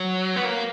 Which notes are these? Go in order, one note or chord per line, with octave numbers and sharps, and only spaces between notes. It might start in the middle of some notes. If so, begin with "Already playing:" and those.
Already playing: F#3
B3
A#3